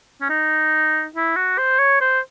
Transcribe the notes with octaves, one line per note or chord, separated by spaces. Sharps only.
C#4
D#4
E4
F#4
C5
C#5
C5